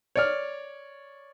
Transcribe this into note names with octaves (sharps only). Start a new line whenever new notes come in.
C#5 D5 F6